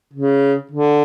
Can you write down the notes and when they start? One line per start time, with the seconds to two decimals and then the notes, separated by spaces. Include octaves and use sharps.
0.13 C#3
0.72 D3